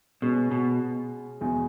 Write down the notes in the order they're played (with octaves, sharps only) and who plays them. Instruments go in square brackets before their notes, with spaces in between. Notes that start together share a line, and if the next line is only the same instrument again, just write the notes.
[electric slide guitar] B2 [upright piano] G#3 C#4 F#4
[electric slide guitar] B2
[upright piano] E2 B2 G#3